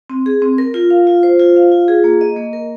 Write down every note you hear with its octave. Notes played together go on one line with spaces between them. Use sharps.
C4
G#4
C4
A#4
F4
F5
F4
C5
F4
F5
F4
G#4
A#3
D#5
A#3
A#4